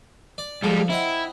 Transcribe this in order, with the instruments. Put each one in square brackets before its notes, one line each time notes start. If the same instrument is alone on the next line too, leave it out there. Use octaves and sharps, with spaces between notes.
[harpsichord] D5
[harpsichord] F3 A4 [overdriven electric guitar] G3 G#3
[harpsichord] C4 D#5 F#5 [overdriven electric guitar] E4